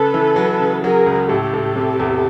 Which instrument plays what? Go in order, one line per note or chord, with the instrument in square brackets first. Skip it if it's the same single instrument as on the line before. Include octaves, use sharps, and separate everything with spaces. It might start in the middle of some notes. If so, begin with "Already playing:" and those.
Already playing: [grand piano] C#3 [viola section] A4 B4
[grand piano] E3
F#3
C#3
[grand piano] F#3 [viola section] G#4 A#4
[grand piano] C#2
[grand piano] A2 [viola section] G4 A4
[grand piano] A2
C3
E2